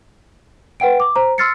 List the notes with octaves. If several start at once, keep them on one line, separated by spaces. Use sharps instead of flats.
B4 F#5 G5 D7
D6
C5 A#5
C6 E6 F6 A6 C7 C#7